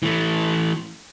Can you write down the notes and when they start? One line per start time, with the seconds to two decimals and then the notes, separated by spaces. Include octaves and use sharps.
0.03 E3 A3